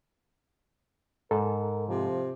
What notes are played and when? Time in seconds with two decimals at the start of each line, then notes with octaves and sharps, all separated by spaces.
1.31 G#2 A4 A#4
1.88 C3 F3